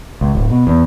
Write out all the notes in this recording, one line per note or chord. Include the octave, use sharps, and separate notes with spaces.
C#2
D1
B2
E2